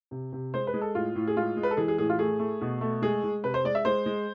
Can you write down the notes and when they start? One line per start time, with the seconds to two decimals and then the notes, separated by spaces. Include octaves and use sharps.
0.11 C3
0.33 C3
0.54 G#3 C5
0.67 B4
0.74 G#3
0.81 A4
0.95 A2 F4
1.16 A2
1.27 G#4
1.36 G#3 F4
1.57 G#3
1.63 B4
1.71 A4
1.77 E3 G#4
1.88 G#4
1.98 A2 G#4
2.10 F4
2.19 A3 G#4
2.39 A3
2.61 B2
2.81 A3
3.02 G#3 G#4
3.24 G#3
3.44 C3 B4
3.54 C5
3.64 G#3 D5
3.75 E5
3.85 G#3 C5
4.06 G#3